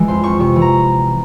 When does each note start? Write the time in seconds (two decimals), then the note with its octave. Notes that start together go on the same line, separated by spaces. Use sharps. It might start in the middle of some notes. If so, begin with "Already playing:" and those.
Already playing: E3 G#3 G#5
0.08 F2 C6
0.24 F2 C#6
0.40 C3 C#6
0.56 E3
0.62 A#5